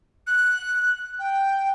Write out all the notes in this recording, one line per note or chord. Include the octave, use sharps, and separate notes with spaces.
F#6
G5